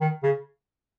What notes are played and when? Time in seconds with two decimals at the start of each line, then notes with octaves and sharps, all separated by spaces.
0.01 D#3
0.23 C#3